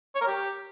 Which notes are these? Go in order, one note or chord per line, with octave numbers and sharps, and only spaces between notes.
C#5
A#4
G4